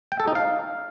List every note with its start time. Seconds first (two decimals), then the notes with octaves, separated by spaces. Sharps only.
0.12 G5
0.20 A4
0.27 D#4
0.35 F5